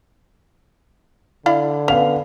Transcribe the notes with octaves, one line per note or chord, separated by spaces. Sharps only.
D3 E4 D5 F5
B3 C#4 F5 F7